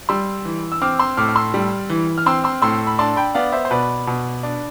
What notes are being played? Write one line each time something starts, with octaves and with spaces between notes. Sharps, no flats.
G3 C6 E6
E3
E6
C4 D6 F6
C6 E6
A2 D6 F6
F6
C6 E6
G3
E3
F6
C4 C6 E6
C6 E6
A2 C6 E6
B5
D4 A5 C6
G5 B5
B3 D5 F5
C5 E5
C5
B2 B4 D5
B2
D4